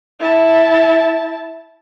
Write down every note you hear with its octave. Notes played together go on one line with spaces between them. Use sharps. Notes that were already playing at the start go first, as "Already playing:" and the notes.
E4 A5